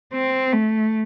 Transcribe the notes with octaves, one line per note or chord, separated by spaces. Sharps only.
C4
A3